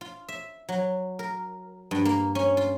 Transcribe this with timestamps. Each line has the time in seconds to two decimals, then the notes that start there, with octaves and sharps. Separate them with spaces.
0.01 F4
0.28 E5
0.69 F#3
1.19 A#4
1.91 G2
2.05 A#3
2.35 C#4
2.57 F4